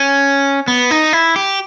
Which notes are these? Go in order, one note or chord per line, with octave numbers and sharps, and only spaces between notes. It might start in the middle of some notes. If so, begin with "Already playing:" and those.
Already playing: C#4
B3
D#4
E4
G4